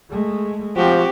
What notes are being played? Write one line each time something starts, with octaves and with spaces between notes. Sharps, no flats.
G#3 A3
F3 C4 F#4 G4